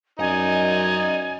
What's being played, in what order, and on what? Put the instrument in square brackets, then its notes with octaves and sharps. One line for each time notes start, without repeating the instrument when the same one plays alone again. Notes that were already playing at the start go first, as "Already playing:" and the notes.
[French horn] F#2 [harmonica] D#4 [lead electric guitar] D5 D#5 [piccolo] G#5